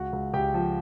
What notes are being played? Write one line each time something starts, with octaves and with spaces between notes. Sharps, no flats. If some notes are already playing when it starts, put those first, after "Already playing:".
Already playing: C#2 F#4 F#5
C#2
C#2 G4 G5
F3